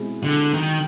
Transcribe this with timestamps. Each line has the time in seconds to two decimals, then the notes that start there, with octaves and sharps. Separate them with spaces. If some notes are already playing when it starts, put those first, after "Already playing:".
Already playing: B2 G#3 C4 E4
0.24 D3
0.54 D#3